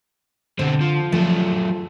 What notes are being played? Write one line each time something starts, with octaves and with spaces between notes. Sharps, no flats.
B2 D3 C4
F3
F#2 F3 A3